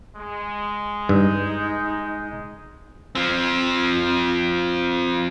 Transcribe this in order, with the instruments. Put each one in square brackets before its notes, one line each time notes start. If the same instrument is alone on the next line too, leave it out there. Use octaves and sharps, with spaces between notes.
[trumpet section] G#3
[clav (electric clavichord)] G2 [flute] D#4
[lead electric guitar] F3 C4